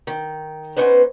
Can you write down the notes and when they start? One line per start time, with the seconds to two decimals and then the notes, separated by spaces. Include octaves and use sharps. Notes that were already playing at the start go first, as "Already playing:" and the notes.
0.07 D#3
0.76 B3 C#4 D#4 B4 C5